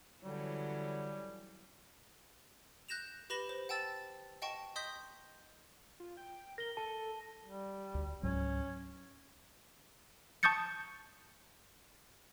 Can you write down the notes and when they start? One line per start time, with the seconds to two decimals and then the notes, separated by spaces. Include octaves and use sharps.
0.24 D3 E3 F#3 G3 C#4
2.89 F#6 G6 A#6 E7 F7
3.30 G4 B4 B5 A#6 E7 G7
3.49 C5
3.69 F#5 G5 A5 E6 A6
4.42 D#5 F#5 G5 A5 C#6
4.76 D#5 C6 D#6 G6 B6 G7
6.00 F4
6.17 G5
6.58 A#4 A#6 G7
6.77 A4 A5
7.45 G3
7.95 D2
8.23 C#2 G#2 F#3 C#4
10.43 A5 C#6 D#6 G6 A6 C#7